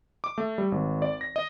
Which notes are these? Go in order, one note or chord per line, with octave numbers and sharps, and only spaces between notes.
D6
A3
G3
G#1
D5
A#6
D#5